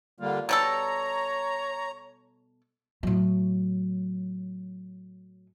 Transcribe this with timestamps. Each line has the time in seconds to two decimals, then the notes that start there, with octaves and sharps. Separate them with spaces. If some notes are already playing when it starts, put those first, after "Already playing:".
0.20 D3 G3 A#3 F4
0.49 B2 G3 A4 C#5 A#5
3.03 A2 F#3